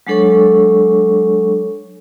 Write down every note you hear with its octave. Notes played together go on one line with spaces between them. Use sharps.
F#3 G#3 D4 A4 C#5 C#6